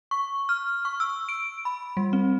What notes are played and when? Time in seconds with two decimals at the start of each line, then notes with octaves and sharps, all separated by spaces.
0.11 C#6
0.49 F6
0.85 C#6
1.00 E6
1.29 D7
1.65 B5
1.97 G3
2.13 C4